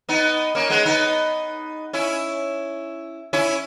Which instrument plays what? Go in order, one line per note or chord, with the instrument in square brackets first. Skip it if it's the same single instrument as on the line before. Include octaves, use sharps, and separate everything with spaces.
[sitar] B3 D#4
A#3 C#4
G#3 B3
B3 D#4
C#4 E4
C#4 E4